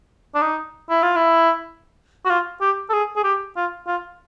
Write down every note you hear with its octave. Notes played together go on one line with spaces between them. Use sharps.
D4
D#4
E4
F4
E4
F#4
F4
G4
A4
G#4
G#4
G4
F4
F4